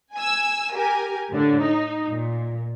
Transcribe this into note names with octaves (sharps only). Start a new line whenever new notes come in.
G#5 E6
G4 A#4 G#5
A2 D3
D#4
A#2